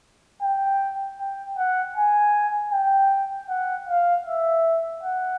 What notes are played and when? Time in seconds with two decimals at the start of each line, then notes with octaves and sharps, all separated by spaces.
0.42 G5
1.19 G5
1.58 F#5
1.96 G#5
2.72 G5
3.49 F#5
3.88 F5
4.26 E5
5.03 F#5